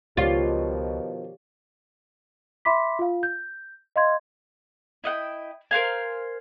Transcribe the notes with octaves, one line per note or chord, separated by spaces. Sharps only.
C#2 B2 D#3 F3 F4 G4 C#5 D5
E5 B5 C6 D6 B6
F4 F5
G6
D#5 F5 C6 G#6
E4 D#5 F#5 G5
A#4 C5 F5 G#5